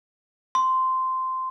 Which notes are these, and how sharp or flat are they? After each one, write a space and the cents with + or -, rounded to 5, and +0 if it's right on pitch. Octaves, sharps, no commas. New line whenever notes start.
C6 -10